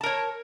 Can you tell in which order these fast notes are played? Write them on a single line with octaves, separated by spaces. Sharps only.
A5 A#4 C#5